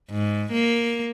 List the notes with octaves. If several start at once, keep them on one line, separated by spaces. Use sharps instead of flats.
G#2
A#3